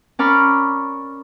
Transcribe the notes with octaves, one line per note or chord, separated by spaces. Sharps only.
C#4 A#4 D5 B5 C#6 F6